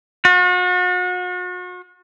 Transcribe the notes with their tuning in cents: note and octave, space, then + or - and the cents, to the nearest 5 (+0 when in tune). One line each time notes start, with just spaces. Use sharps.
F#4 -40